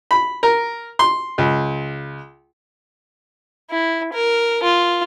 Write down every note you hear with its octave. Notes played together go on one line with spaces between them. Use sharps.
B5
A#4
C6
C#2
E4
A#4
F4